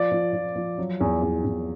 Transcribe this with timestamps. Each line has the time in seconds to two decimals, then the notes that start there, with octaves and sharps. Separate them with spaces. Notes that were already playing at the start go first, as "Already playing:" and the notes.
Already playing: F3 D5
0.12 F3
0.33 F3
0.56 F3
0.78 F#3
1.01 E2
1.22 E2
1.45 E2